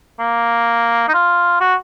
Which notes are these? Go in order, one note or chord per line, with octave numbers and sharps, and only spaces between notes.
A#3
D#4
F4
F#4